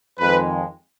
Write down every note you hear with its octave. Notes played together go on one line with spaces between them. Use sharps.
F2 D#3 G#3 B4